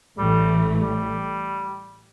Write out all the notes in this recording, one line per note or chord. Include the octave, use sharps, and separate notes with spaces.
A1 A2 E3 G3 A3
G3